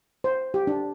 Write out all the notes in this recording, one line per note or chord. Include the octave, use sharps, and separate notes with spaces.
C5
G4
D4